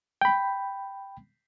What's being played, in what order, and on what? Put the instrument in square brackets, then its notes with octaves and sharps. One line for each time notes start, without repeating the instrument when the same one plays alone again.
[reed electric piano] G5 B5